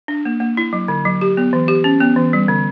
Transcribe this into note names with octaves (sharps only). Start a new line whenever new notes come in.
D4
A#3
A#3
E4
F#3
D3
F#3
G4
B3
E3
G4
C#4
B3
E3
G3
D3